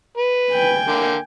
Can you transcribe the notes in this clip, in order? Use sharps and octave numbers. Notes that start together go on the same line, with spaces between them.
B4
G5 G#5
D3 A#3